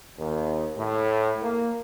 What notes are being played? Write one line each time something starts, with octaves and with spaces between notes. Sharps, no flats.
D#2
A2
A#3